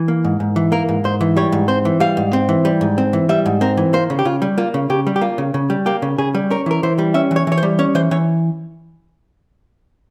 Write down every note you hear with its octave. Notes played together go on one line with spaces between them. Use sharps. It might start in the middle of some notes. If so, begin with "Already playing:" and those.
Already playing: E3
A#3
G#2
G#2
E3
A#3 A#4
G#2
G#2 C5
E3
G3 C#5
G#2
C4 C5
E3
G3 F5
G#2
C4
E3
G3
G#2
C4
E3
G3 E5
G#2
C4 A#4
E3
A#3 C5
C#3
G4
C#3 F4
G3
A#3 F4
C#3
C#3 G4
G3
G4
A#3 F4
C#3
C#3
G3
A#3 G4
C#3
C#3 G#4
G3
C#4 A#4
E3 A#4
E3 C5
G3
C#4 E5
E3
C#5
E3 C#5
C5
G3
C#4 C#5
E3 C5
E3 C#5